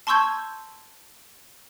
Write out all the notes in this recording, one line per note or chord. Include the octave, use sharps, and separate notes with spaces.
A5 C6 C#6 E6 G6 G#6